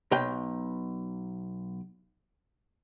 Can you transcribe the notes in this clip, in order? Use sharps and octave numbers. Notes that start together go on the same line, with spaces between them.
B1 G5